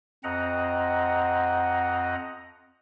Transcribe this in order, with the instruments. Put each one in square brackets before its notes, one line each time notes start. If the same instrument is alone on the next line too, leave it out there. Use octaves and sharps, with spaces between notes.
[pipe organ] F2 C4 D#5 F#5 A#5